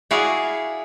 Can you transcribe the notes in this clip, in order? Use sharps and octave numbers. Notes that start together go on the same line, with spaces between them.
E4 F#4 G#4 D5 F5